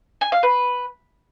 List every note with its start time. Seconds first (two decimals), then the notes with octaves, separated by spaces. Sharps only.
0.21 G#5
0.32 F5
0.43 B4